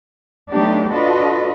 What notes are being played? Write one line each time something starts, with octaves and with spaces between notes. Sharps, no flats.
F#3 A3 B3 D4 D#4 G4
D4 F4 F#4 A4 B4 D#5